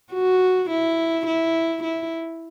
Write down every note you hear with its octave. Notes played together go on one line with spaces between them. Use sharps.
F#4
E4
E4
E4